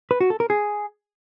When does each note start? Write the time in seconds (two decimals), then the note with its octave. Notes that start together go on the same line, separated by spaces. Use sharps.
0.11 B4
0.20 F#4
0.30 A4
0.40 A#4
0.50 G#4